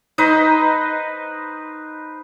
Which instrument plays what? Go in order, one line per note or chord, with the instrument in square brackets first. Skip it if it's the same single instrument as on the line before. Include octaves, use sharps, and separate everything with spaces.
[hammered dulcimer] D#4 B4 C5 D#5